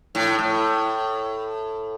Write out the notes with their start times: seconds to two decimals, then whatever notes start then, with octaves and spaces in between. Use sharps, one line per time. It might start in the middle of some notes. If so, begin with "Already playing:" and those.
0.15 A2
0.39 A2